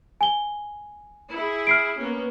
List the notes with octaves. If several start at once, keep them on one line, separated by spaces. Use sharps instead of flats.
G#5 G7
E4 G#4
F6 C7 D7
A#3 B3 C#4